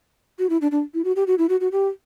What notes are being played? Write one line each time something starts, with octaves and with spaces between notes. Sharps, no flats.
F#4
E4
D4
D4
E4
F#4
G4
F#4
E4
F#4
F#4
G4